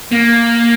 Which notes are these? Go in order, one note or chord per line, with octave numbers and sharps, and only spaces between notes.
A#3